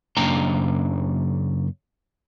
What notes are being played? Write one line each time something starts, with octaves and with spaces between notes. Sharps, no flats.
F#2 C#3 A#3 D4 G5 A#5